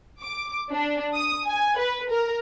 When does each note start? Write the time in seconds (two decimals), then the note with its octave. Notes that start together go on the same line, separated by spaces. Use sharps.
0.21 D6
0.71 D4
1.14 D#6
1.46 G#5
1.78 B4
2.10 A#4